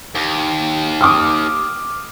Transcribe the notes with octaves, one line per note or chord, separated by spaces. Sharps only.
D#2
D6 D#6 F6